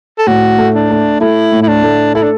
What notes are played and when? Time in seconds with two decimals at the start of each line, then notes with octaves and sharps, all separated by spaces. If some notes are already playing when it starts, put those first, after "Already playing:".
0.18 A4
0.27 A2 F#4
0.58 A3
0.75 D4
0.90 A3
1.21 A3 E4
1.52 A2
1.63 E4
1.68 D4
1.83 A3
2.15 E4 A4
2.23 D4